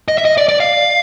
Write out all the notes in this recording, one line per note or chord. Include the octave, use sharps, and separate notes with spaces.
D#5
E5
D#5
D5
D5
F5